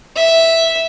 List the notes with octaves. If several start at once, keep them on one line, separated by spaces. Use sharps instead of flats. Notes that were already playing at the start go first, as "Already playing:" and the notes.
E5